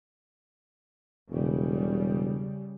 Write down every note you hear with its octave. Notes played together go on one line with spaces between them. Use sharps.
E1 C#3 G3